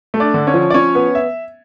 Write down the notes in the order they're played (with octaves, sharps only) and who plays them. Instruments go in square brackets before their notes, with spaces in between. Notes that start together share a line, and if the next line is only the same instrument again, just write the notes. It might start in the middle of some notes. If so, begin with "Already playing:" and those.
[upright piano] A3
[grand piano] D4 D5
[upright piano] D3
[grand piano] C#4 C#5
[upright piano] F3
[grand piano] D5
[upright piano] F3 [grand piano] C#4 C#5
[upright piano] B3
[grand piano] E5